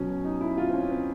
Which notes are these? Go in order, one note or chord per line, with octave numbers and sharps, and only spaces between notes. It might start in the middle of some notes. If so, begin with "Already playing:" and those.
Already playing: B2 F#3 C#4
D#4
E4
F4
C4
C#4
C4